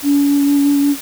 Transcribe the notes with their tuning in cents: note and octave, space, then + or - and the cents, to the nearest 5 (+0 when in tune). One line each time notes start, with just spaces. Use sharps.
C#4 +40